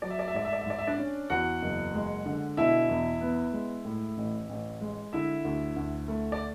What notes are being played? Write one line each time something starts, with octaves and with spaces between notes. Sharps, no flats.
F#3 D5
E5
D5
E5
G#2 D5
E5
D5
E5
G#2 D5
E5
D4 D5
C#4
E2 F#4 F#5
F#1
G#3
D3
B2 E4 E5
E2
B3
G#3
A2
A1
A1
G#3
D3 E4 E5
D2
D2
A3
D5